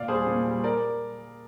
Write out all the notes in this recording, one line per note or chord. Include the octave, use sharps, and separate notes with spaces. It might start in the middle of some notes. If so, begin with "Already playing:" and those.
Already playing: A#2 D5 F5
G3 G#4 C5
A#2
G3
A#4 D5